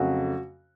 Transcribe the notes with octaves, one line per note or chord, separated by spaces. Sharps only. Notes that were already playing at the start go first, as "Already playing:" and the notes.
Already playing: F2 C#3 F#3 A3 F#4